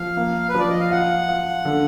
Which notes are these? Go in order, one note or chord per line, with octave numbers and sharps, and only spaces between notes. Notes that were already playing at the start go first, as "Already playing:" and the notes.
Already playing: F3 F5
A#3
B4
F3 D5
D#5
F5
F4 F#5
F4
D3